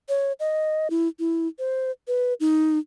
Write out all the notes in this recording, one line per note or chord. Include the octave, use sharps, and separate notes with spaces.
C#5
D#5
E4
E4
C5
B4
D#4